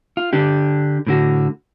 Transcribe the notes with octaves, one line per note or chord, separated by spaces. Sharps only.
F4
D3 D4 G4
A2 D3 F#4